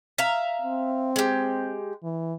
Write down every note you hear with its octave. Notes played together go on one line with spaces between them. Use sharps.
E5 F5 A#5
C4
G#3 G4
E3